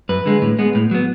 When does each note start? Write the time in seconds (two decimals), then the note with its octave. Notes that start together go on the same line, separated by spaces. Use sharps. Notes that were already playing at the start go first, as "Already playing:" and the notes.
0.09 F#2 B4
0.26 D3 G#3
0.42 A2
0.59 G#3 B3
0.75 A2
0.91 F#3 B3